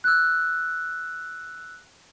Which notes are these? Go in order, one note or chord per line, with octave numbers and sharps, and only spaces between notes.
E6 F#6